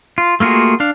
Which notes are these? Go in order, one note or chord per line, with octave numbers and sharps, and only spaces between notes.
F4
A3 A#3 F4 F#4 G#4
D4 F5